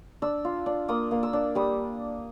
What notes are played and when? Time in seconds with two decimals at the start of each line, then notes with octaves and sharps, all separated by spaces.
0.22 D4 E6
0.44 F4
0.66 D4
0.88 A#3 D#6
1.11 A#3
1.23 E6
1.33 D4
1.55 G3 D#6